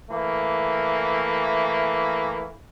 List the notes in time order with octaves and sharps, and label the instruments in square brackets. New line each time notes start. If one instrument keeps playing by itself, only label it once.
[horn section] E3 A3 A#3